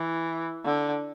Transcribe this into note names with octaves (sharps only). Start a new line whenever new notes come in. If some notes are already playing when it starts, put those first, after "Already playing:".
Already playing: E3
D3